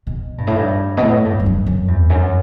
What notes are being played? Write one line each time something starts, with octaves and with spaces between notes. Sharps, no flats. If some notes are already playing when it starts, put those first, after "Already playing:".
B2
G2
A2
G2
B2
A2
G2
G2
F#2
F#2
E2
F#2